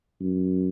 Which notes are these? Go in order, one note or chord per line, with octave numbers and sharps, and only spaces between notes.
F#2